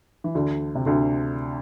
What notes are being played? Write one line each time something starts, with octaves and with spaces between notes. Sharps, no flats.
E3
D2 D3
C3
D2 D3